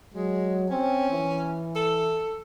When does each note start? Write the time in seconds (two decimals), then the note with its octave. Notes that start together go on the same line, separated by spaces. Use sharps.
0.14 F#3 G#3
0.70 C4 C#4
1.11 E3
1.75 A4